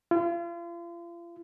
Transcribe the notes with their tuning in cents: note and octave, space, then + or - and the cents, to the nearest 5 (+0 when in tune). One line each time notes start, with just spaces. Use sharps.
F4 -35